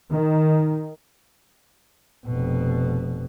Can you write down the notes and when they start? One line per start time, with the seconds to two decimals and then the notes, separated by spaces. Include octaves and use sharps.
0.12 D#3
2.26 F1 B2